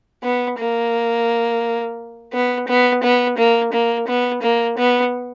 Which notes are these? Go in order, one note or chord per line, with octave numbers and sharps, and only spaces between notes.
B3
A#3
B3
B3
B3
A#3
A#3
B3
A#3
B3